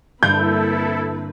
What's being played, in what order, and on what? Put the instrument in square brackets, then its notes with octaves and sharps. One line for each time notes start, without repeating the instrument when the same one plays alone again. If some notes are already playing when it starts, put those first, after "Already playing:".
[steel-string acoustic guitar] G2 D3 [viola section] A#3 C4 B4 [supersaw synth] E4 A4 [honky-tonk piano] G6